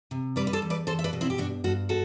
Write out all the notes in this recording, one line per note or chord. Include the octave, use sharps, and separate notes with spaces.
C3
G3 B4 D5
B4
A4 C5
E2
B4 D5
E2 A4 C5
E5
B4 D5
B2
C4 E4
G4
G2 D4 F#4
G2 F#4 A4
F#4 A4